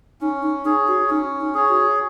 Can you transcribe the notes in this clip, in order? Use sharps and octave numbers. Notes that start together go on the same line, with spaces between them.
C#4 D#4
D#4
D#4 G#4 C#5
F#4
C#4 D#4
D#4
G#4 C#5
F#4